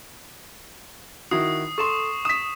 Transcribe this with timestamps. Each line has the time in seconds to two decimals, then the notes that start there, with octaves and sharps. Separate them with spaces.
1.31 D#3 E4 F#4 D#6 C7
1.78 A4 C6 C#6 E7
2.25 D#6 B6 E7